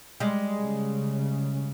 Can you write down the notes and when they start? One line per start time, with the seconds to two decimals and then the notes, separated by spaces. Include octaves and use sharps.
0.20 G3 G#3
0.60 C#3